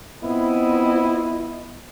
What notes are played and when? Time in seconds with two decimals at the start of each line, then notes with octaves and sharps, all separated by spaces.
0.24 B3 C4 E4 F4 D#5